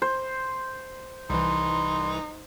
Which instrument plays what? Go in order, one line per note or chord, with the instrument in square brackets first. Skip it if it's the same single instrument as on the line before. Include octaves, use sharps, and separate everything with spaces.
[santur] C5
[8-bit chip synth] C2 E3 [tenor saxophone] D#4 [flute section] B5 C6